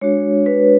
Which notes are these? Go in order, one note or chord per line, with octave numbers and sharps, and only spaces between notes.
G#3 D4 F#4 C#5
B4